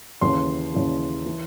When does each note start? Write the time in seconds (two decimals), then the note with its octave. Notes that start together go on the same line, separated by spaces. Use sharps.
0.21 D#2 C#3 E3 C6
0.74 D#2 C#3 E3
1.26 E3